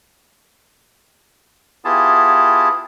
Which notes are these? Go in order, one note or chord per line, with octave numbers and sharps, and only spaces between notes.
B3 E4 F4 G4 G#4 A5